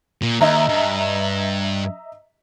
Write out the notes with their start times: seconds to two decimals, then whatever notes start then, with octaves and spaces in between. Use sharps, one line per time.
0.22 A#2
0.41 D#2 D#5 E5 A#5
0.69 G2